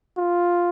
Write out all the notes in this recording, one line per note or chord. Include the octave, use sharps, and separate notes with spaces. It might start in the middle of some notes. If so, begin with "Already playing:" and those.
F4